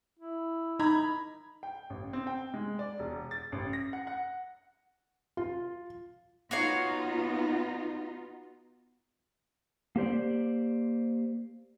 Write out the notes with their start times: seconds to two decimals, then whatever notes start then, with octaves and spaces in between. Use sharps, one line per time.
0.19 E4
0.80 D#4 A#5 B5 G#6
1.63 G5
1.90 A1
2.13 C4
2.27 G5
2.54 G#3
2.79 D5
2.99 E1
3.31 A6
3.52 A1
3.73 A#6
3.93 F#5
4.07 F#5
5.37 F4
6.51 B3 D#4 F4 F#4 C#5 F5
9.96 A#3 G4 C5 D5